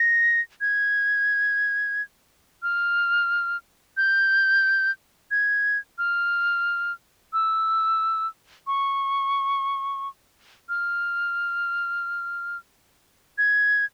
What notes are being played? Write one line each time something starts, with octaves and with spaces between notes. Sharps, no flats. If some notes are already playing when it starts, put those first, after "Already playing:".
Already playing: A#6
G#6
F6
G6
G#6
F6
E6
C#6
F6
G#6